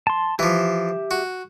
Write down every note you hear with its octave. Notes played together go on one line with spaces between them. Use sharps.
A5 C6
E3 F3 G4 E5
F#4